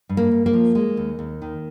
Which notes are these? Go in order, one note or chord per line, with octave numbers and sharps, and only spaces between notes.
G2
A#3
G2
A#3
F3
G#3
D#2
D#2
D#3